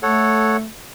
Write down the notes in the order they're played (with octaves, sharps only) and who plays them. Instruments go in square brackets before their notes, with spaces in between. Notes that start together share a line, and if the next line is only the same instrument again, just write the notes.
[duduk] A3 [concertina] A4 C#5 F#5